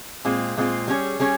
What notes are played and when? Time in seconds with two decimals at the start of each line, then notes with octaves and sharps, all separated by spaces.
0.25 A#2 G#3 C4 F4
0.57 A#2 G#3 C4 F4
0.88 G3 C#4 G#4 C#5
1.20 G3 C#4 G#4 C#5